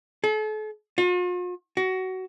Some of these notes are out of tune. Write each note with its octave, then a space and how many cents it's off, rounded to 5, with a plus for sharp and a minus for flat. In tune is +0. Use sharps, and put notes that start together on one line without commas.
A4 -40
F4 +45
F#4 +20